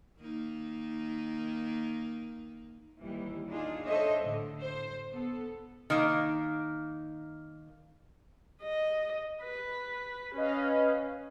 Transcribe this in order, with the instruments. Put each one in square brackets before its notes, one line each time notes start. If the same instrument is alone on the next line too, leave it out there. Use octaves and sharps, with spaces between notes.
[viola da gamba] D#3 A#3 D#4
[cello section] D#2 E3 G3
D4 D#4 F4 G#4
D4 A4 C5 C#5 D#5 E5
A2 D3
C5
B3 A4
[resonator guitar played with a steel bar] D#3 A#3
[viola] D#5
B4
[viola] C#4 [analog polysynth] B4 D#5 F5